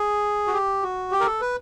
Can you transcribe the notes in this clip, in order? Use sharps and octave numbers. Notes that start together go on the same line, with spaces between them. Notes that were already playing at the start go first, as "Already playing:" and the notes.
Already playing: G#4
F#4
G4
F#4
G4
A#4
A4
B4